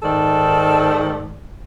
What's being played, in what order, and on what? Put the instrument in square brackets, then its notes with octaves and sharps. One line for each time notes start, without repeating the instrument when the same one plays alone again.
[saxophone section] G#2 D#3 A4 D5